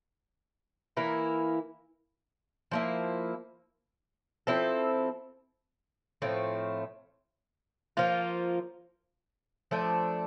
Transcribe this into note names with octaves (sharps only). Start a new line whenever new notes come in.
E3 A#3 E4 A#4
F3 A#3 E4
F3 C4 E4 A4
A2 F3 A3 C4
F3 A#3 F4
F3 A3 D4 A4